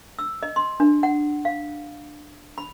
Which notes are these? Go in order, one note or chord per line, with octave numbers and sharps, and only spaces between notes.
E6
D#5
C6
D4
F#5
F5
B5